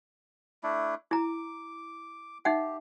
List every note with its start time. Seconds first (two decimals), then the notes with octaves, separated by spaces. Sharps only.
0.63 A3 D4 E4
1.11 E4 A#5 D6
2.45 D#4 G4 E5 F#5